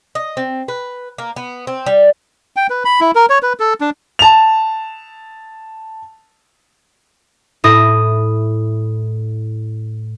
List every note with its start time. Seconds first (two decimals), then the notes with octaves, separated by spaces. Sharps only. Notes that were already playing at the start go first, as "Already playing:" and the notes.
0.15 D#5
0.37 C4
0.68 B4
1.18 A#3
1.36 B3
1.67 C4
1.86 G3
2.56 G5
2.70 B4
2.85 B5
3.00 E4
3.15 A#4
3.30 C#5
3.43 B4
3.60 A4
3.81 D4
4.19 A5 F7
7.64 A2 E4 D#6 A#6